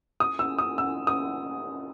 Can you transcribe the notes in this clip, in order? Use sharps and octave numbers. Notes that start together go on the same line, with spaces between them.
D#6
E6
D#6
E6
D#6